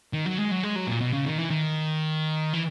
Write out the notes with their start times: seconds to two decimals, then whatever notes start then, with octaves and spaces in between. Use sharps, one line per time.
0.13 D#3
0.26 F#3
0.38 G#3
0.51 F#3
0.63 G#3
0.76 F#3
0.88 A#2
1.01 B2
1.13 C#3
1.26 D#3
1.38 E3
1.50 D#3
2.53 E3